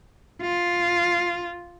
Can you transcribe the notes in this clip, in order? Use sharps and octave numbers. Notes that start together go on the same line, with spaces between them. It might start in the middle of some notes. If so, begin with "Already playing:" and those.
F4